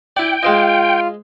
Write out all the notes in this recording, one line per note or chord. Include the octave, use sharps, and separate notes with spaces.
E4 D5 G5
G#3 F4 C5 D#5